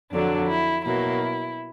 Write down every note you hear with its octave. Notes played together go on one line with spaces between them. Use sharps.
F2 D3 F#3 D4
E4
B2 F#3 A#3 E4